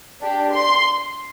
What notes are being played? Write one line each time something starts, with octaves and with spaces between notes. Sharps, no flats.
D4 G4
C6